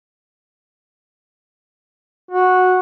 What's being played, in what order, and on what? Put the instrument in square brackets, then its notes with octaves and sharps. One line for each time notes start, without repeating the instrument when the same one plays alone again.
[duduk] F#4